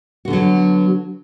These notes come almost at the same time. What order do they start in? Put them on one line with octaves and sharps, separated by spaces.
F#4 D3 B3 F#3